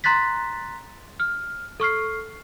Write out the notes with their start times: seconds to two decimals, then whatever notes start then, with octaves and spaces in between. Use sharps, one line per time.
0.04 A#5 C6 F#6 A6 B6
1.20 F6
1.80 A4 C#6 F6 C7